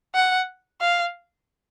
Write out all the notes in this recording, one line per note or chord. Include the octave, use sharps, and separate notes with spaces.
F#5
F5